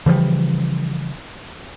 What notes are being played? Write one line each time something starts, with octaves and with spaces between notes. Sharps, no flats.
C#3 E3 F3 G3